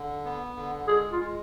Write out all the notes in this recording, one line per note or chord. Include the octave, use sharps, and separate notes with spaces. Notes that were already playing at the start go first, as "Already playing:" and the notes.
Already playing: D3
B3
D3
G#3 G#4
F4
G#3